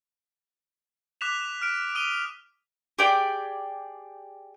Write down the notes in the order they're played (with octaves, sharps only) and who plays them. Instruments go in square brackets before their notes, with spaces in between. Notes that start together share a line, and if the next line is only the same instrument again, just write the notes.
[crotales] D6 F#6 B6 E7 F7
F6 D7
D#6 D#7 F7 G7
[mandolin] G4 G#4 D5 G5